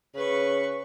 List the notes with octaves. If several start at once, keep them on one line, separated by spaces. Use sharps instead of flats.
C#3 B4 C#6